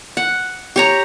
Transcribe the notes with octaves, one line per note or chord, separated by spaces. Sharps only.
F#5
G4 C#5 A#5